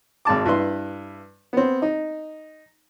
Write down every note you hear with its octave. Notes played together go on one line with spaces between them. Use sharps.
G#1 G#3 A5 D6
G2 E4 B4 C6
B3 C4
D#4